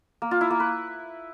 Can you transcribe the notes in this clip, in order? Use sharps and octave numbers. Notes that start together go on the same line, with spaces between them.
A#3
F4
E4
A#3
B4